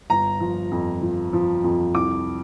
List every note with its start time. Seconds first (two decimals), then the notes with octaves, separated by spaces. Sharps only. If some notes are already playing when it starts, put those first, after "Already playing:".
0.10 G1 A#5
0.40 F3
0.72 F2
1.02 F3
1.33 F3
1.64 F2
1.95 C2 D6